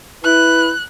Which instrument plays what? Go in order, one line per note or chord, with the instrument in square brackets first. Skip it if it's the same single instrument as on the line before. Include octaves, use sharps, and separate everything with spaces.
[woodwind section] E4 B4 [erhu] F#6